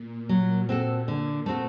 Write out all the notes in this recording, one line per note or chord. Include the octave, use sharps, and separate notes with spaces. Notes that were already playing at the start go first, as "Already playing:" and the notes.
Already playing: A#2
F#3
C4 F#4 A4
A#2 D3
A3 C4 F#4 A4